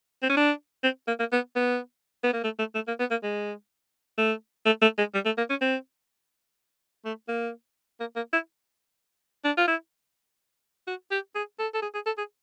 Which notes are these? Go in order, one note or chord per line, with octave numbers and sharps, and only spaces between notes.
C4
C#4
D4
C4
A#3
A#3
B3
B3
B3
A#3
A3
A3
A3
A#3
B3
A#3
G#3
A3
A3
A3
G#3
G3
A3
A#3
C#4
C4
A3
A#3
A#3
A#3
E4
D4
F4
E4
F#4
G4
G#4
A4
A4
G#4
G#4
A4
G#4